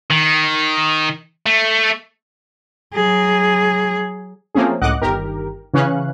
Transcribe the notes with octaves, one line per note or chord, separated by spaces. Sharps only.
D#3
A3
F#3 G#4
F3 A3 A#3 C4 C#4 G#4
C#2 A2 D#5 F#5 D6 F#6
G1 D#3 G4 A#4
C#3 E3 C#4 F5 F#6